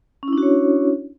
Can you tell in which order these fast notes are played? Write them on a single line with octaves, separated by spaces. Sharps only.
C#4 E4 D4 F#4 C#5